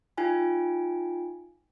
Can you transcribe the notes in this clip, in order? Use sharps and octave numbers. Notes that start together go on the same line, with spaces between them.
D#4 F4 G5 G#5